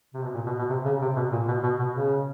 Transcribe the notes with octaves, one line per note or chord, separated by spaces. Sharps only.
C3
B2
A#2
B2
B2
C3
C#3
C3
B2
A#2
B2
B2
B2
C#3